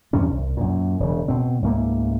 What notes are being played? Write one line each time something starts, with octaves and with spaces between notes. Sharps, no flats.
E2 G2 C3 C#4
C2
F#2 A#2
E1 C#3
B2 C4
C#2 G#2 A3 A#3